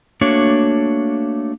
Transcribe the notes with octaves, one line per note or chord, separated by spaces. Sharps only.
A3 A#3 D4 F#4 C#5